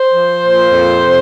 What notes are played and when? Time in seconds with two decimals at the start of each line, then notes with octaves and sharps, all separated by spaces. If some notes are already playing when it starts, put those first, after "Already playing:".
Already playing: C5
0.13 F3
0.42 A#2
0.70 F2
1.00 C3